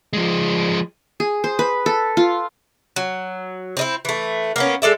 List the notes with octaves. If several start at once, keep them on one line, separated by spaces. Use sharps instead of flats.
F3 G#3
G#4
C5
B4
A4
F4
F#3
C4 D#4 E4
E3 A3
A#3 B3 C#4
G#3 A4 D5 E5